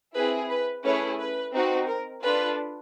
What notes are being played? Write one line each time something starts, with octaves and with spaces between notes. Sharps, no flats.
C4 E4 G#4 B4
B4
A3 C#4 E4 G#4 B4 C#5
B4
C4 D#4 F#4
A#4
D4 F4 A4 B4